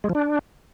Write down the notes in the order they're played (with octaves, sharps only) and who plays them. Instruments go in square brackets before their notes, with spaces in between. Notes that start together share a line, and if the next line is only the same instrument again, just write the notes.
[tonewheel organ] G#3
F3
D4